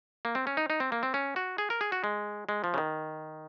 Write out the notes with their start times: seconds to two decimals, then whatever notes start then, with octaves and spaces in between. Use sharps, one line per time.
0.25 A#3
0.35 C4
0.47 C#4
0.57 D#4
0.70 D#4
0.80 C4
0.92 A#3
1.03 C4
1.14 C#4
1.36 F#4
1.58 G#4
1.70 A#4
1.81 G#4
1.92 F#4
2.04 G#3
2.49 G#3
2.64 F3
2.74 C#3
2.78 D#3